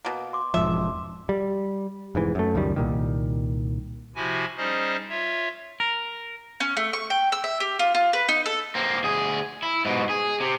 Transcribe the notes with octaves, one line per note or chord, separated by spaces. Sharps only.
B2 A#3
C6 D6
E1 G#2 F3 E5
G3
F1 G#2 E3
F#2 A3
C#2 F#2 D#3 G3
C2 A#2 D#3
C3 F3 E4 F#4 G4 G#5
G3 C#4 D#4 G#4 C5 D#5
F4 C#5 E5
A#4
C#4
A3
C#6
G5
E6
E5
G4
F4
F4
B4
D#4
A4
A#3 C4
D2 G#4
E4
G#2 B2
G#4
C3